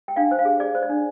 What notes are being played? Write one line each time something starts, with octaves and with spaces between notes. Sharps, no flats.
G5
D4 F5
C5
F5
G#4
G#4 D5
C5
D5
D4